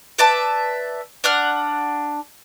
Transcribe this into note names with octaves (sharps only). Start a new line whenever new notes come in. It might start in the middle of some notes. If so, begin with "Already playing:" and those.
B4 D5 E5 A5
D4 F#5 F6